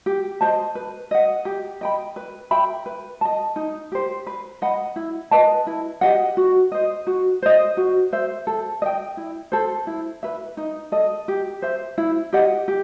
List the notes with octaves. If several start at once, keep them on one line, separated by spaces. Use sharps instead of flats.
G4
C5 D#5 A5
B4
D#5 F#5
G4
D#5 G5 B5
B4
E5 G5 B5
B4
D#5 A5
D#4
G4 C5
B4
D#5 F#5 B5
E4
B4 D#5 A5
E4
G4 D#5 F#5
F#4
C5 D#5
F#4
C5 D#5
F#4
C5 E5
A4
D#5
G5
E4
A4 C5
E4
B4 E5
D#4
A4 D#5
G4
C5 E5
E4
G4 D#5 F#5
G4